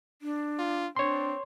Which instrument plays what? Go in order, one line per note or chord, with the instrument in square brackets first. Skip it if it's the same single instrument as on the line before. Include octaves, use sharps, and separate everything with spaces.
[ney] D4
[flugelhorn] F4
[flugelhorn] C4 [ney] D4 [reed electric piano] C#5 C6